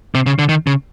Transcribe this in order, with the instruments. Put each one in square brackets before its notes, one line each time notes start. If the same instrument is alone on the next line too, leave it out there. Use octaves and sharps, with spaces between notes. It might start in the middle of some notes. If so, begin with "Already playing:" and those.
[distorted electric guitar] C3
C#3
D3
D#3
C#3